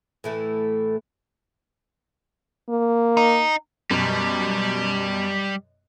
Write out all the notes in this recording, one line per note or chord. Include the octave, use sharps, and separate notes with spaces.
A2 E3 A3
A#3
D#4
F#2 B2 G3